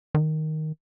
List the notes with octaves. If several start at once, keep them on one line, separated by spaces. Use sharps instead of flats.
D#3